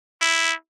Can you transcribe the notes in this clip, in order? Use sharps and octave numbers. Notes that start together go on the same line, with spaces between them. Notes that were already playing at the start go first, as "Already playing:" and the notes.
E4